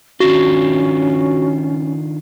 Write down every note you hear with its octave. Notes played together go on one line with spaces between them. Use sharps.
D#3 C#4 D4 F4 F#4